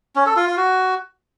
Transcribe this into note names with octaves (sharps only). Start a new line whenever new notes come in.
C#4
A4
F4
F4
F#4